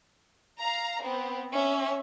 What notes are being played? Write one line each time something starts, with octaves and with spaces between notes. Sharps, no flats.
F5 A#5
B3 C4
C#4 E5